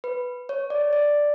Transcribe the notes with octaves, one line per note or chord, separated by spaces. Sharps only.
B4
C#5
D5
D5